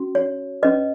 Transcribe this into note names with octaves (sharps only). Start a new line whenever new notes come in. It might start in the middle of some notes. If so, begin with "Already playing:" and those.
Already playing: C#4 F#4
C#5
C#4 B4 D#5